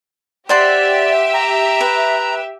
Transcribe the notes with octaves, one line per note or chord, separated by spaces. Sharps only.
G4 C5 D5 E5 F#5 C6
A#5
B4